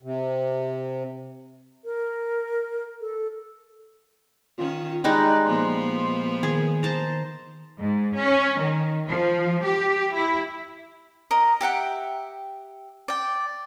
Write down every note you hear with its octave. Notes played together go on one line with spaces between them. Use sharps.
C3
A#4
A4
D#3 C#4 F4
G3 G#3 D#4 D5 F#6
A#2 F3 B3 C6
D#3 G#4
C5 A5 A#5
G#2
C#4
D#3
F3
G4
E4
A#4 D#5
G4 E5 F#5 G5
D5 G5